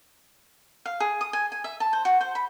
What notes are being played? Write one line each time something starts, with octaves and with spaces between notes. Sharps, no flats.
F5
G#4
D#6
G#5
G#5
E5
A5
C5
F#4
C5
B5